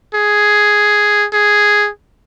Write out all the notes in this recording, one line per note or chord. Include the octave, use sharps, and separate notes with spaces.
G#4
G#4